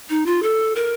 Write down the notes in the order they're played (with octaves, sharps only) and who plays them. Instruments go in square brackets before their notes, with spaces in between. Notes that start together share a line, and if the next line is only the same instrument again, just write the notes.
[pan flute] D#4
F4
A4
A#4